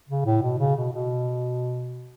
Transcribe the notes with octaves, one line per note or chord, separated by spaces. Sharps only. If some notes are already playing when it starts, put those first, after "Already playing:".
C#3
A2
B2
C#3
B2
B2